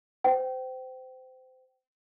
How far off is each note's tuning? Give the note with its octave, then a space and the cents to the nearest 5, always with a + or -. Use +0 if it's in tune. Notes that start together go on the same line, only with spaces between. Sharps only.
C5 -25 G5 -25